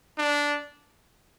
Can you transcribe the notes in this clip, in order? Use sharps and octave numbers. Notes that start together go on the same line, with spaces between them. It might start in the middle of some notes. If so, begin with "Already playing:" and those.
D4